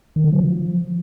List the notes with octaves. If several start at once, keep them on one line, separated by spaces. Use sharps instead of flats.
D#3
D3
F#3
F3